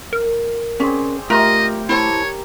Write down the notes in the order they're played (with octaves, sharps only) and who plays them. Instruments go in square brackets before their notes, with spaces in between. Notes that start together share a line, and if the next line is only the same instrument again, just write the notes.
[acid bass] A#4
[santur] C4 G#4 D5 [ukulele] C#4
[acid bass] A3 [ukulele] F4 [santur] G4 A#4 [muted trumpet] D#5
[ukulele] E4 C5 A5 [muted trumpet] C#5